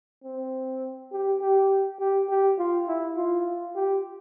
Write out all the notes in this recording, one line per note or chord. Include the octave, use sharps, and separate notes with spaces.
C4
G4
G4
G4
G4
F4
E4
F4
G4